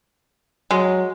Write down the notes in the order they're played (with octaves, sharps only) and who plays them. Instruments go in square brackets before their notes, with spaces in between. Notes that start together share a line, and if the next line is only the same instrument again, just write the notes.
[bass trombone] F#3 [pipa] G#3